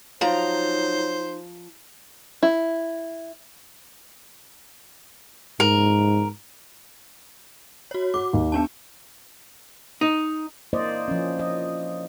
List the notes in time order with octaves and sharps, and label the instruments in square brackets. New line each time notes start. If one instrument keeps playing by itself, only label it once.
[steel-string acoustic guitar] F3 A#5 [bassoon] F#3 [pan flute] D#4 [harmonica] C5
[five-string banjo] E4
[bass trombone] G#2 [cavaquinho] A#4
[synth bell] F#4 C#5
[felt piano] F#4 [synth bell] D6
[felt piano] D#2
[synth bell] B3 D4 A5
[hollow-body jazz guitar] D#4
[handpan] A#3 E4 C5 D5 D#5
F3 C#4
D#5